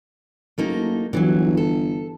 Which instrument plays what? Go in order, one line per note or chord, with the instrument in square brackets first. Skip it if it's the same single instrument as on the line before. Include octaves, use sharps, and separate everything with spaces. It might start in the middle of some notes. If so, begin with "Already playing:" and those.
[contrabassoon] F#1 [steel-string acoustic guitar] A3 A#3 D#4
[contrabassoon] G1 [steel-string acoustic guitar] D3 E3 F#3
[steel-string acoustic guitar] A4